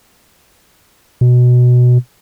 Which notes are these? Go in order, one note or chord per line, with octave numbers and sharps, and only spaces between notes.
B2